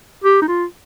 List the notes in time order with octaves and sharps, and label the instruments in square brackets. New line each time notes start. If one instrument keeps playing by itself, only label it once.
[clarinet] G4
D#4
F4